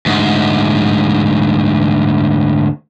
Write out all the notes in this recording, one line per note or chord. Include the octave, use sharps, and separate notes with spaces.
D2 G#2